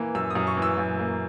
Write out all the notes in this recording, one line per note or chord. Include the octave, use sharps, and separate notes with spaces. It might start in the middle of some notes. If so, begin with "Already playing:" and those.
Already playing: E3 A#3
F#2 E6
D#6
F#2
C#6
E3
E6
F#2
A#3